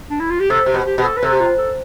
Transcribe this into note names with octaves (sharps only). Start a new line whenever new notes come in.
D4
E4
F4
G4
C3 A4
C3 G4
B2
G4
B2 G4
A4
B4
C3 A4
G4
F4
A4